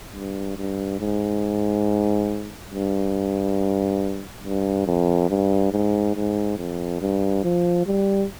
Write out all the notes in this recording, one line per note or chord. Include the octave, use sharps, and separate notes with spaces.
G2
G2
G#2
G2
G2
F2
G2
G#2
G#2
F2
G2
F3
G3